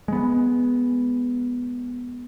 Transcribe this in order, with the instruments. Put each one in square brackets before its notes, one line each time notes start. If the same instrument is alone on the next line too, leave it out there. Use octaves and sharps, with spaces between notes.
[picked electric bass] G#3 B3